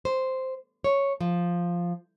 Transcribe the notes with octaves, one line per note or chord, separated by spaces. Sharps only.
C5
C#5
F3